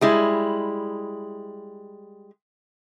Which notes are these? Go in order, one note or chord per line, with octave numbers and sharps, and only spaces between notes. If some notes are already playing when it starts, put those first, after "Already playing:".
G3 G#3 E4